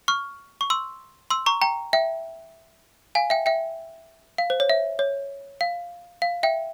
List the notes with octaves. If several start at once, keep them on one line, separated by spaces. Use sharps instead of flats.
C#6 F6
C#6
C6 E6
C6 E6
A#5 C#6
G5 A#5
E5 G5
F5 G#5
E5 G5
E5 G5
F5
C5
C#5
E5
C#5
F5
F5
E5 G5